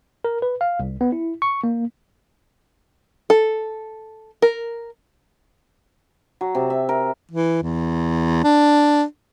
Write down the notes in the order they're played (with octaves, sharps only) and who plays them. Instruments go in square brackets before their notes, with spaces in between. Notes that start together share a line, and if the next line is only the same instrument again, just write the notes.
[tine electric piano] A#4
B4
F5
C2
B3
E4
C#6
A#3
[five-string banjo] A4
A#4
[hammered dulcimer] F#3
C3
E5
A#4
[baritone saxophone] E3
E2
D4